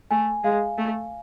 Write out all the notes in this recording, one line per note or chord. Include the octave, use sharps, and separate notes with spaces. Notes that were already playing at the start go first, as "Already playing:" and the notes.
A3 G#5
G#3 F5
A3